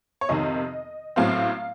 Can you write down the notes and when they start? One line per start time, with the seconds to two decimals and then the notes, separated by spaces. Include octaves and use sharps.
0.21 C#5
0.29 F2 C3 D#3 D#5
1.16 A1 A2 F#3 C4 F5